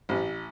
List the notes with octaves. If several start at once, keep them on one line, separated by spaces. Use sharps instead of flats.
A1